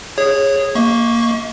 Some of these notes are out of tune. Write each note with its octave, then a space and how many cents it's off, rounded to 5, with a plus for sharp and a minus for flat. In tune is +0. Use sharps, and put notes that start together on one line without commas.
G#4 -10 C#5 -15
A#3 +0 D#5 +45 C#6 +0